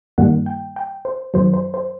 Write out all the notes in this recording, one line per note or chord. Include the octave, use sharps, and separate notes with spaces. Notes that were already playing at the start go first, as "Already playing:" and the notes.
G2 D#3 G3 A#3 F#5
G5
G5
C5
F#2 D#3 F#3 C5
C5
C5